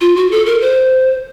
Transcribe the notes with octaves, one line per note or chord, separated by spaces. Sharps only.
F4
F#4
A4
A#4
C5